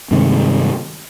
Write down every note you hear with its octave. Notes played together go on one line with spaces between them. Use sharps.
G2 C3 D#3 G#3